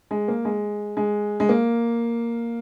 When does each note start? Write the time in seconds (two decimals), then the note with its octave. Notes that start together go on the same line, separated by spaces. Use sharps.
0.11 G#3
0.28 A#3
0.45 G#3
0.97 G#3
1.40 G#3
1.49 A#3